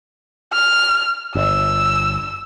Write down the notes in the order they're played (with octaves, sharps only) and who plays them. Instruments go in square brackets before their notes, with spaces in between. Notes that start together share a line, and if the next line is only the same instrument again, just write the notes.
[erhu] F6
[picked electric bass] G1 [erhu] E6